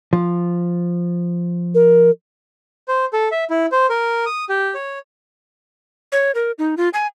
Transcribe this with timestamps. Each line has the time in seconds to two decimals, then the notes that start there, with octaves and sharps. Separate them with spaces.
0.13 F3
1.75 A#4
2.88 C5
3.13 A4
3.31 E5
3.50 E4
3.72 C5
3.90 A#4
4.26 D#6
4.49 G4
4.74 C#5
6.12 C#5
6.35 A#4
6.59 D#4
6.77 F4
6.94 G#5